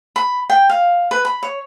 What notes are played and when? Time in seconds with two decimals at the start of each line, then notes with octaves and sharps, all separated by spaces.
0.16 B5
0.50 G5
0.69 F5
1.11 B4
1.25 B5
1.43 C#5